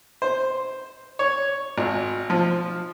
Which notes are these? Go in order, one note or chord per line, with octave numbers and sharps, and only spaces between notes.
C5
C#5
G#1
F3